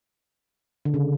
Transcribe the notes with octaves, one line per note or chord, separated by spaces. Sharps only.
D3
C#3